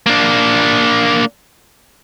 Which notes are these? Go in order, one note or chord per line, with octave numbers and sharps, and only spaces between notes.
A#3 D4